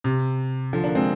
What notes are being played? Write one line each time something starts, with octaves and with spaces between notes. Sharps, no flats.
C3
D3 F3
A#3 D4
G#3 C4